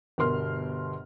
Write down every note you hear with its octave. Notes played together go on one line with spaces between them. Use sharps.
G1 B2 A#4 C6 F6